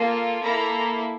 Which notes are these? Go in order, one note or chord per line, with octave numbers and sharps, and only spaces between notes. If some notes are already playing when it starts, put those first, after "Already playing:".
Already playing: A#3 F4 A4
A#3 E4 A4 A#5